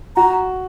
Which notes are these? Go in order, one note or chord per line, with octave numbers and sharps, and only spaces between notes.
F#4 A#5